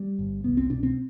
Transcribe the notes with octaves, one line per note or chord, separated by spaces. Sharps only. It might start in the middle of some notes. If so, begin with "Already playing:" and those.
Already playing: G3
G1
C2 B3
C4
B2 D4
C4